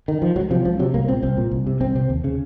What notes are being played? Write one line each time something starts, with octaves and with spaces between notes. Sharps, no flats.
D#3
F3
C#2 F#3
C3 F3
C#2 F3
C3 F#3
C2 A#3
A#2 C4
C2 C4
A#2
C2
C3
C2 C4
C3 C4
D#2
C#3